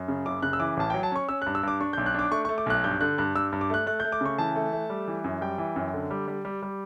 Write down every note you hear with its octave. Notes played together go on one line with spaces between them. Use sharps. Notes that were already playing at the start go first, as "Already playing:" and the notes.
Already playing: F#2
C#3
F#1 D6
C#3 F#6
E6
E3 D6
A1 A5
F#3 G5
A5
C#4 C#6
C#4 E6
F#6
G2
E6
G2 D6
D4 C#6
G6
B1
F#6
D4 D6
A3 C#6
C#6
A3
D6
B1 F#6
G2 G6
D3 F#6
G2 F#6
G2 E6
G2
D6
A3 F#6
A3 F#6
G6
A3
D6
C#3 C#6
E3 A5
A3
A3
G3
E3
F#2
G3 G5
E3
F#2
D3
G3
G3
G3
G3